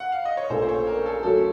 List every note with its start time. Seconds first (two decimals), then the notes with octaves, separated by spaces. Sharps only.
0.00 F#5
0.12 F5
0.25 D#5
0.37 C#5
0.50 A#1 A#2 A3 C#4 A4 C5
0.62 C5
0.69 C#5
0.87 A#4
1.06 A4
1.23 C#3 F#3 A3 C#4 F#4 A4